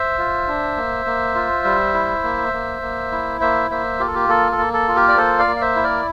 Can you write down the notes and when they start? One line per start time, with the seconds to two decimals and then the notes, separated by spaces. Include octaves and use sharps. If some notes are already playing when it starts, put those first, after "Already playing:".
Already playing: C5 E5
0.18 F4
0.48 D4
0.77 A#3
1.06 A#3
1.35 F4
1.64 G3
1.94 E4
2.23 A#3
2.53 A#3
2.82 A#3
3.12 E4
3.41 A#3 C5 E5
3.70 A#3 C5 E5
4.00 F4 G4
4.07 A4
4.15 G4
4.29 A#3 A4
4.52 A4
4.58 A#3
4.73 A4
4.88 F4
4.96 G4 A#4
5.08 D5
5.17 A#3 A4 C5
5.39 D5 F5
5.47 A#3
5.56 F5
5.61 C5 E5
5.76 E4
5.84 A#4 D5